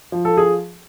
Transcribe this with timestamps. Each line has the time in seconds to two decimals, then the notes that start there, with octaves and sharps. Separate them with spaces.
0.12 F3
0.25 A4
0.37 G#4